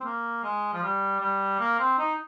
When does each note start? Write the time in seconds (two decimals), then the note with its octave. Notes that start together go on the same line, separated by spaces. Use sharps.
0.01 C4
0.04 A#3
0.43 G#3
0.73 F3
0.83 G3
1.20 G3
1.59 A#3
1.79 C4
1.99 D#4